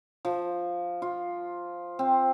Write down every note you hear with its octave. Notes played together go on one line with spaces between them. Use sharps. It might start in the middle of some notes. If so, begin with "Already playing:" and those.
F3
F4
C4